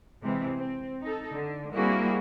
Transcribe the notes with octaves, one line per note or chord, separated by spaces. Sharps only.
C3 E3 G#3 C4
C4
D#4 A4
D3
G3 A#3 C4 E4 F#4 G#4